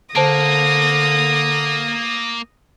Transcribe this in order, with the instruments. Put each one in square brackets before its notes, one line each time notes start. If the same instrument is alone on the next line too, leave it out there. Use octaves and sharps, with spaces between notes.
[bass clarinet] D3 [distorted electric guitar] A#3 [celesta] C5 A5 D7 [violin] D#6 A#6